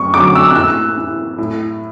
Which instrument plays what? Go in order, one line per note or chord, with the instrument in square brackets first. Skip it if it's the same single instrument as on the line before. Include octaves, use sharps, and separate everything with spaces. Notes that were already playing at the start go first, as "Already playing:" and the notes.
Already playing: [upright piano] F#2 C#6
D3 F#3 D6
E6
F#6
A2 E6
E3
A2